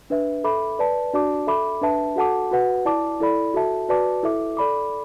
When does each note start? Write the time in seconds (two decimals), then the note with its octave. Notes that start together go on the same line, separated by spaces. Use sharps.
0.10 D4 B4 E5
0.44 A4 E5 B5 D6
0.79 B4 D5 A5
1.13 D4 F#4 D5 A5 D6
1.47 A4 E5 B5 D6
1.82 D4 B4 E5 A5
2.16 F#4 A4 F#5 A5 D6
2.52 F#4 B4 F#5
2.85 E4 D5 A5 D6
3.20 E4 A4 D5 B5
3.54 F#4 A4 E5 A5
3.89 F#4 B4 D5 A5 D6
4.23 E4 A4 E5 D6
4.57 A4 D5 B5 D6